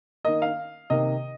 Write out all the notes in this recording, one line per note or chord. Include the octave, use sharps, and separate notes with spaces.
D#3 A#3 D#5
F5
C3 D#3 A#3 D#5